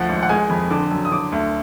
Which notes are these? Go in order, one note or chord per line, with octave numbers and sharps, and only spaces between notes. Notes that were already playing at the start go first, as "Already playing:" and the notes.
Already playing: D2 F3 F#5
G#1
F#5
G#3 G#5
F2 B5
D3 D6
F#2
D#6
D3 D6
D2